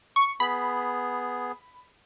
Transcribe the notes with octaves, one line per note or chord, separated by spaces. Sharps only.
C#6
B3 G#4 B5